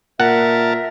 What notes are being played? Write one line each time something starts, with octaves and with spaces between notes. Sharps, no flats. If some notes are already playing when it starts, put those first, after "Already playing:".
A#2 A#4 E5 F#5 A5